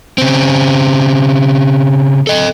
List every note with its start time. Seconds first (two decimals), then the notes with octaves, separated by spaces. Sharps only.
0.18 C#3 C4
2.27 A4 D#5